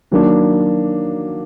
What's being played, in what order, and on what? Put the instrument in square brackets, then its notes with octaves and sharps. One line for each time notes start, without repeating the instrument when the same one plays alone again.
[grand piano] D#3 F#3 A#3 D4